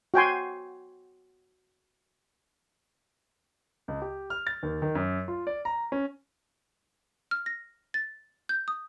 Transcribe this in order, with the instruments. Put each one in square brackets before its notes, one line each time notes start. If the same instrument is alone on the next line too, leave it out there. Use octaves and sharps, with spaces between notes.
[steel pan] F#4 G5 G#5 C6
[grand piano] C#2
G4
F6
A6
D#2
D#3
F#2
F4
D5
A#5
C#4
[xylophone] F6
A#6
A6
G6
D#6